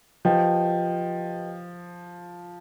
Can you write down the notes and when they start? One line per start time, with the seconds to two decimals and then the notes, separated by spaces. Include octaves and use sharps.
0.25 F3 G4 B4 D#5 G5